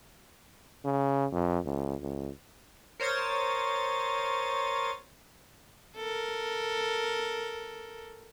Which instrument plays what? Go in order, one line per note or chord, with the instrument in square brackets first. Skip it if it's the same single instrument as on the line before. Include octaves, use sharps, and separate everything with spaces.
[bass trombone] C#3
F2
C#2
C#2
[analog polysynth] A#4 C5 C#5 D#6 A6
[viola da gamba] A4 A#4